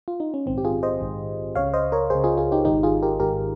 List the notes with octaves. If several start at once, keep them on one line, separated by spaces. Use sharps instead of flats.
F4
D#4
C#4
A#1 G#2 D#3 C4
G4
F4 G#4
C5 D#5
A#1 G#2 D#3
C#2 C#3 C#5 F5
C5 D#5
A#4 C#5
C#2 C#3 G#4 C5
F4 G#4
F4 G#4
D#4 G4
G#1 G#2 D#3 D#4 G4
F4 G#4
G4 A#4
G#1 G#2 D#3 G4 A#4